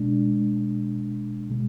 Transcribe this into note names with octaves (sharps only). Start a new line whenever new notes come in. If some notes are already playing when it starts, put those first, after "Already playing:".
Already playing: B2 G#3 D4
B2 G#3